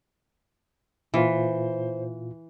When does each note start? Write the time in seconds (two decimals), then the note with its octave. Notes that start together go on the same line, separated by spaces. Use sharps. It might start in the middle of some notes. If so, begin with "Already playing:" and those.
1.14 A#2 E3 F4 C5